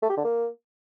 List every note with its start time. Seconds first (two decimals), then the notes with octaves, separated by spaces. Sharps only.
0.03 A3
0.10 G4
0.17 D3
0.24 A#3